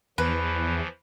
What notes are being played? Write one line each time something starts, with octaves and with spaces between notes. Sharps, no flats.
E2 E3 F3 B4